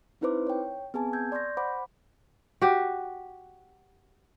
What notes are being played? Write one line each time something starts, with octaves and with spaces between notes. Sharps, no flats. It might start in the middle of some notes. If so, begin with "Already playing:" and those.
C4 D#4 E4 B4 C5 D6
C#5 G5
B3 C4 G#4 G#5 A5
E6 G6 G#6
D5 C6 C#6 G6 A#6
C5 F#5 B5 D6
F#4 G4